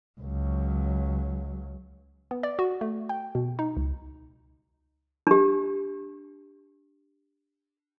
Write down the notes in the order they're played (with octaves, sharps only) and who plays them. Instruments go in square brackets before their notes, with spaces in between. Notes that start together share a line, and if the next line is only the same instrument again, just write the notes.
[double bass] C#2 F#3
[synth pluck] B3
D5
F#4
A3
G5
B2
D#4
C#2
[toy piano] D4 G4